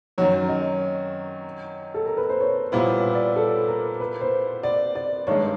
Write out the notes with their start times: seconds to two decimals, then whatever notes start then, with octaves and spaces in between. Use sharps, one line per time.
0.18 F#2 D#3 F#3 C#5
0.49 D#5
1.94 A4
2.06 A#4
2.17 B4
2.29 C5
2.40 C#5
2.72 A#2 G3 B3 E4 C5
2.93 C#5
3.15 D5
3.36 A4
3.68 A#4
4.00 B4
4.21 C5
4.63 D5
4.95 D5
5.27 G2 D#3 G#3 C#5